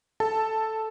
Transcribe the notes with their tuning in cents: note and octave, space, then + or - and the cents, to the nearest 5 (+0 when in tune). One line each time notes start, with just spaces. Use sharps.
A4 +0 A5 +0